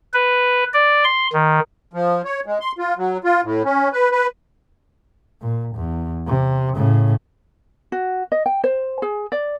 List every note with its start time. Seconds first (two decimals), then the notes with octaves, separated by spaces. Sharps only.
0.14 B4
0.73 D5
1.04 C6
1.33 D#3
1.94 F3
2.25 C#5
2.46 G#3
2.61 C6
2.78 F4
2.98 F#3
3.24 F4
3.44 A2
3.65 C#4
3.93 B4
4.12 B4
5.41 A#2
5.76 E2
6.27 C3
6.75 A2 C#3
7.92 F#4
8.32 D#5
8.46 G5
8.64 C5
9.02 G#4
9.32 D5